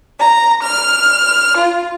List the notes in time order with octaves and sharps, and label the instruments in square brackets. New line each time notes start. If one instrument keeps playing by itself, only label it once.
[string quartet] A#5
F6
F4